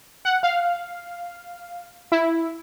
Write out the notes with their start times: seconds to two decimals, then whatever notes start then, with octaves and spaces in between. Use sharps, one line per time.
0.25 F#5
0.43 F5
2.12 E4